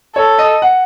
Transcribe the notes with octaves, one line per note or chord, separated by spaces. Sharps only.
A4 C#5
D#5
F#5